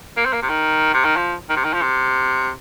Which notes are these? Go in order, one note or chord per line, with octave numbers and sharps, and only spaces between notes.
A#3
C4
A#3
C3
D#3
C3
D#3
F3
D#3
C3
D#3
F3
C3